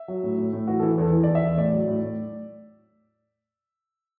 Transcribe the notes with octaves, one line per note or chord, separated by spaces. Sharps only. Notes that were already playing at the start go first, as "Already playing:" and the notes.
Already playing: E5
F#3
A2
A2
A2
E3 F#4
E3 A4
E2 A4
E3
E2 D5
E5
E2
A2 D5
F#3
A2
A2